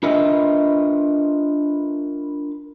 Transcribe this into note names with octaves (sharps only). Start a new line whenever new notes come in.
D4 F4 A#4 B4 D#5 E5